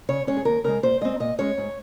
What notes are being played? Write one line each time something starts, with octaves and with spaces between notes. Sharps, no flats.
C#3 C#5
G#3 C#4 C#5
G#4
D#2 A#4
C#3 G#3 A#4
A#2 C5
G#3 C4 D#5
A#2 D#5
G#3 C#4 C#5
G#2